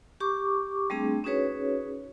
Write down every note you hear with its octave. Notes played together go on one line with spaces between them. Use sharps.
G4 C#6 D6
G3 A3 C4 D4 G#4
C#4 D#4 F#4 G#4 B4 C#5